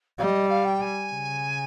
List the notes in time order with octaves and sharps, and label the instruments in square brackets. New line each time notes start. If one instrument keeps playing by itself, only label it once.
[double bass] G3 [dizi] F5
[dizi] D#5
F5
G5
G#5
[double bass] C#3